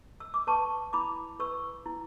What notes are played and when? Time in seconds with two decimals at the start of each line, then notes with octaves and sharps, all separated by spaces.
0.20 E6
0.34 D6
0.47 B4 A5 C#6
0.93 E4 B5 D6
1.39 B4 C#6 E6
1.86 E4